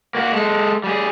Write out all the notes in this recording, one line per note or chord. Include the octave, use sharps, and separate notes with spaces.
A#3 F#4
G#3 A4
G3 G#4